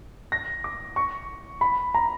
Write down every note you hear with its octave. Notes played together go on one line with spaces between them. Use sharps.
A#6
D6
C#6
B5
A#5